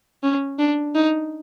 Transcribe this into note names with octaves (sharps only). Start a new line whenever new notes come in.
C#4
D4
D#4